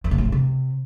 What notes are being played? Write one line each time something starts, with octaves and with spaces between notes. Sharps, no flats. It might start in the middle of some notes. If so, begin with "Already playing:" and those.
F2
B2
G#2
A2
C3